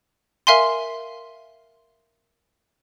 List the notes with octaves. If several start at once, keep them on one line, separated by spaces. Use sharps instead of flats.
A#4 E5 F5 G#5 C6